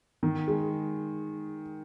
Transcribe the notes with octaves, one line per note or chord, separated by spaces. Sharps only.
D#3
G#3